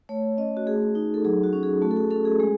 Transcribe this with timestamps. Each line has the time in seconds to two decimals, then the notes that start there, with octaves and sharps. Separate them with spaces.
0.09 A3 C#5
0.37 C#4 D#5
0.57 F#4
0.67 A3 G#4
0.95 D#4
1.14 A4
1.25 F#3 G#4
1.43 F#4
1.53 C#4
1.63 G#4
1.82 A3 F#4
1.91 A4
1.96 G#4
2.11 C#4 A4
2.25 G#4
2.40 G#3 G#4